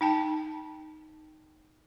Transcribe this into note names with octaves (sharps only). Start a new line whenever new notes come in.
D#4 G5 A5